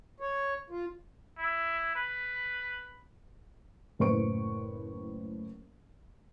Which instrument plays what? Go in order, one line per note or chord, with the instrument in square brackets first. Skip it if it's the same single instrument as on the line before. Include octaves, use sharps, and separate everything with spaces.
[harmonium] C#5
F4
[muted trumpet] E4
B4
[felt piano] F#1 A2 B4 C5 C#6 D7